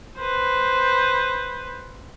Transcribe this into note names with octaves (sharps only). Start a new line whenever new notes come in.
B4 C5